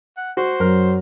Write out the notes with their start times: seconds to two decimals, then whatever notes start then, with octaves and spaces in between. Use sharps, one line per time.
0.17 F#5
0.37 F#4 C5
0.60 F#2 F#3 A#4